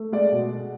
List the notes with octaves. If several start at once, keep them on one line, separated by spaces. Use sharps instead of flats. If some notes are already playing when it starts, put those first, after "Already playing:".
Already playing: A3
G#3 D5
B2
G#3